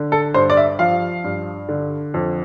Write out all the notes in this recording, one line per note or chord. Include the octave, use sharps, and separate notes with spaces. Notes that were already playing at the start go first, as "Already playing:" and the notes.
Already playing: D3
A4
G2 C5
D5
E5
F3 F5
G2
D3
F2